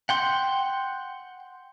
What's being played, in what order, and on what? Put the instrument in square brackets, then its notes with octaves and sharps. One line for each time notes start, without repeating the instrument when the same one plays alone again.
[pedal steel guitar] F#5 G5 C6